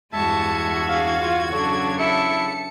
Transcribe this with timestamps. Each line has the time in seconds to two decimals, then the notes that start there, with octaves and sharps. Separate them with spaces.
0.13 E2 G2 G#3 F#4 E5 A5 G#6 C#7
0.89 D4 G#4 F5
1.19 F4
1.52 C#3 F#3 D4 A4 C#5
2.00 E4 A4 E5 A5 C#7